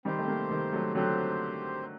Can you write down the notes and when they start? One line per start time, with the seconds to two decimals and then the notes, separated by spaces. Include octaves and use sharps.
0.05 D#3 G3 C4 G4 C5
0.19 A3
0.28 G3 A#3
0.51 D#3 G3
0.73 F#3 A3
0.95 D3 F#3 C4 G4 C5